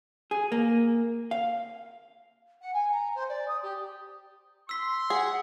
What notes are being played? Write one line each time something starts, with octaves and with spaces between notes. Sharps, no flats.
G#4
A#3
F5
F#5
G#5
A#5
C5
D5
D#6
G4
C6 E6 B6
G#4 F#5